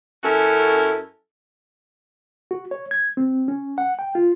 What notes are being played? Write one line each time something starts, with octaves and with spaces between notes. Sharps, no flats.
F#2 C#4 E4 F#4 A4 A#4
F#4
C#5
G#6
C4
C#4
F#5
G5
F4